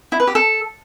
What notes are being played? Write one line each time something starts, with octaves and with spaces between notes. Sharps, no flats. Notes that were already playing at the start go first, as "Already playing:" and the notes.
E4
B4
G4
A4